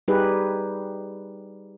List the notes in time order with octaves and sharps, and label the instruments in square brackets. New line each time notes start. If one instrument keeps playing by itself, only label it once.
[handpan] G3 D#4 G4 G#4 B4